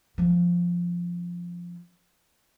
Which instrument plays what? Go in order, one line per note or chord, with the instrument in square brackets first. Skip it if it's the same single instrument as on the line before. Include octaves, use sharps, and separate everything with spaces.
[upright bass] F3 C#4